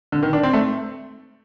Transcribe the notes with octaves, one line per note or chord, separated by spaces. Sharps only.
D3
D#3
D4
C4
A3